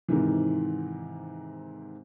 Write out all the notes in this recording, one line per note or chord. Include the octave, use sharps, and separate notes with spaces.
G#2 C3 D#3 E3